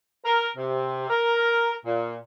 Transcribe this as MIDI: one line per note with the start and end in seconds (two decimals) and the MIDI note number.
0.25 0.48 70
0.57 1.07 48
1.10 1.75 70
1.85 2.16 46